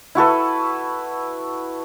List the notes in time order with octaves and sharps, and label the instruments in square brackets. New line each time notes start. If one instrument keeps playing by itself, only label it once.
[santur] E4 F#4 A4 B4